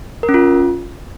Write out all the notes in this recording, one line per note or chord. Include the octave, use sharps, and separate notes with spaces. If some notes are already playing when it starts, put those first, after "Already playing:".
A#4
C#4
F4